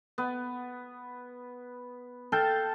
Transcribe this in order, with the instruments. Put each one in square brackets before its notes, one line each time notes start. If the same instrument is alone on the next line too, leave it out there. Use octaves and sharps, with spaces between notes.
[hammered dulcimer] B3
A4 F5 G5 A5